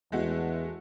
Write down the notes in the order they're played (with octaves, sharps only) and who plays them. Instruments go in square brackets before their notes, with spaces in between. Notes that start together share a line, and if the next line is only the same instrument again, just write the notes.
[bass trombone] E2 [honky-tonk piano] G#3 A3 F#4